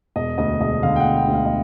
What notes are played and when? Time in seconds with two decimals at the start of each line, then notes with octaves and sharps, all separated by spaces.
0.16 E1 D#5
0.38 D2 D#5
0.61 E1 D#5
0.83 D3 F5
0.96 G5
1.00 F#5
1.05 E1
1.17 G5
1.28 D2
1.34 F5
1.45 D#5